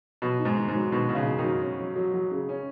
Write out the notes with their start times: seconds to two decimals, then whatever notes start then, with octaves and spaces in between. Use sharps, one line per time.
0.22 B2 F#3
0.39 D#4
0.45 G#2
0.57 D#3
0.68 G#2
0.75 F#3
0.91 B2 D#3
1.09 B2 D#3
1.15 C#3
1.27 F#2
1.38 D#3
1.44 F#3
1.62 C#4
1.79 F#3
1.96 F#3
2.14 F#3
2.31 C#3
2.49 C#4